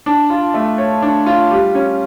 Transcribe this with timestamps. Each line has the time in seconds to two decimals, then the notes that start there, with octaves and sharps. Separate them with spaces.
0.06 D4
0.30 F4
0.54 A3
0.78 C#5
1.02 D4
1.26 F4
1.51 G3
1.75 C#4